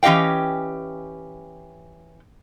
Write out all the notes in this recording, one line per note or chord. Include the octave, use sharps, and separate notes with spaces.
E3 C#4 G4 D#5 F5 G5